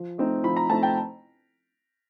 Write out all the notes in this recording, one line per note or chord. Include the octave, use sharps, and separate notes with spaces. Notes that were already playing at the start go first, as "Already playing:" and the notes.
Already playing: F3
A3 C4 D#4
F3 B5
A#5
A3 C4 D#4 A5
G5